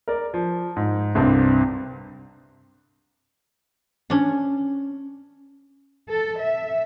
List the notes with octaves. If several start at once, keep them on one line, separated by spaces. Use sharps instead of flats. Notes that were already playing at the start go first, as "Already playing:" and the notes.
A#4 D5
F3
G#2
C2 G2 C4
C#4 D4
A4
E5